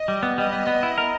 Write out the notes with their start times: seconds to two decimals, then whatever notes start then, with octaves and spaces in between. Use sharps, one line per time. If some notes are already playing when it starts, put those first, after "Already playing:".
Already playing: D#5
0.08 G3
0.23 B3
0.37 G3 D#5
0.53 B3
0.67 B3
0.83 E4
0.98 A#4